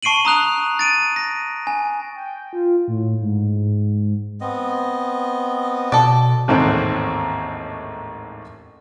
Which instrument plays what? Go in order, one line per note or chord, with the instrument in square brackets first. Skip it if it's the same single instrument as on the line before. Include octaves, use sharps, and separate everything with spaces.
[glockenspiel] A5 C#6 C7 D7 D#7 F#7
A#5 D#6 F#6 F7
A6 D7 D#7
A#6
G#5
[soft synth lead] G5
F4
A2
G#2
[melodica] B3 C4 D#5
[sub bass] B2 [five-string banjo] A4 D5
[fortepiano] A1 D#2 G#2 C4 A4 F#6